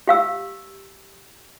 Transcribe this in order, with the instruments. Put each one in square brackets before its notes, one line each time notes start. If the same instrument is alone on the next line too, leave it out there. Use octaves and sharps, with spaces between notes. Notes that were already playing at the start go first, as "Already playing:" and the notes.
[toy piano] G4 F5 E6